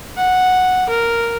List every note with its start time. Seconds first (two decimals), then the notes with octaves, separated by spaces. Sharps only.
0.17 F#5
0.89 A#4